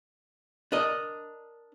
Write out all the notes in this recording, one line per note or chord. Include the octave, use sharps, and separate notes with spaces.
D4 A#4 D#5